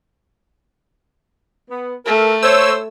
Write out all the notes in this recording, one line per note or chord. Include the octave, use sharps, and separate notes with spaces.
B3
A3 A4 A#4
C5 C#5 E6